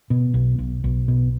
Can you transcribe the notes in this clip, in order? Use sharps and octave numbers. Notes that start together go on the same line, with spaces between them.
B2
B1
B1
B1
B2